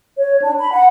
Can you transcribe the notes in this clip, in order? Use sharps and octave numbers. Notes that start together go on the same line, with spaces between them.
C#5
D4
B5
F#5